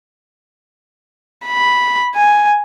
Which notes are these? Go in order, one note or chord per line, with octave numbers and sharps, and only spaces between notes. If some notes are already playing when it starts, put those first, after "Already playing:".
B5
G#5